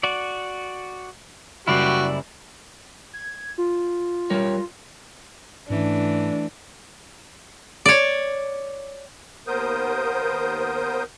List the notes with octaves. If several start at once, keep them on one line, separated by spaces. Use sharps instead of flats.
F#4 D5
F#1 G3 E4 F#4 G4 D5 C7
G#6
F4
G3 A#4 C#5
G#2 E3 A3 C#4 D4
C#5 D5
D#2 B3 A#4 C5 D#6 G6